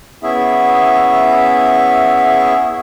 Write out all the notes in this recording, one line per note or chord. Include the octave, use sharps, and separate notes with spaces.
B3 C#4 E4 G#4 E5